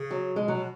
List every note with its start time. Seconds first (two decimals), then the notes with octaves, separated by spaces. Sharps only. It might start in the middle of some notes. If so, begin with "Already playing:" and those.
Already playing: C#3
0.11 F#3
0.35 B2 G#3
0.48 B2 F#3